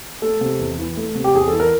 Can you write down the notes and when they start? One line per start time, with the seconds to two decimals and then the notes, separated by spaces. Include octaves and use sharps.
0.22 A3 A4
0.41 C3
0.59 E2
0.79 E3
0.97 A3
1.15 C3
1.24 G4
1.34 E2 G#4
1.48 A4
1.53 E3
1.60 A#4